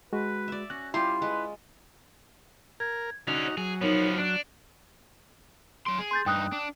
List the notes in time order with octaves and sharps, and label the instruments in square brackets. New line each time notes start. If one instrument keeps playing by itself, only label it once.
[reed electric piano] G#3 F#4 [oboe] B4
[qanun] D5 E5
[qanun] C#4 [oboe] F#4 [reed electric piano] F#6
[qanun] G3 F4 [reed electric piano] E4 [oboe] G4 [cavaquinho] C6
[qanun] G#3 [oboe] B4
[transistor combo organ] A#4 [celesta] G#6
[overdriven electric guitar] D3 C#4 [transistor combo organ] D#4 F#4 [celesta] F7
[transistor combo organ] F#3 [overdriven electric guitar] G#4
[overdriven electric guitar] F3 B3 [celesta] D#4 A#4 C#5
[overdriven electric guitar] D4 [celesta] F#6 D7
[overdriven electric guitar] F#3 C6 [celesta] D7
[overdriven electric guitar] G#4
[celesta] C6 G6 A6
[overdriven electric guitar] G2 D#4 [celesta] G5 D#6 F#6
[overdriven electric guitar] D4